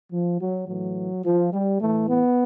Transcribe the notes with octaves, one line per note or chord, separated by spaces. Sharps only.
F3
F#3
A2 E3 F#3
F3
G3
A2 E3 A3
B3